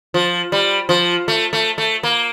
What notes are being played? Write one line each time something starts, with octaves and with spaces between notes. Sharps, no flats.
F3
G3
F3
A3
A3
A3
A#3